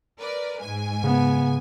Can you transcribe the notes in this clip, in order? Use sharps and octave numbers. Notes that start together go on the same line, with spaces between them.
A#4 B4 D5
G#2 G#5
C#3 B3